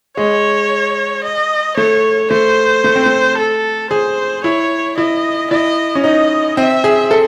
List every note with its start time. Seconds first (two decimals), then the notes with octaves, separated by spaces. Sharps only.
0.17 G#3 C#5
1.24 D#5
1.77 A3 C#5
2.31 A3 C5
2.84 A3
2.96 C4
3.06 A3
3.37 A4
3.90 G#4 C5
4.44 E4 C#5
4.97 E4 D#5
5.50 E4 D#5
5.95 C#4
6.04 D#4 D#5
6.57 C4 E5
6.84 G#4
7.11 A4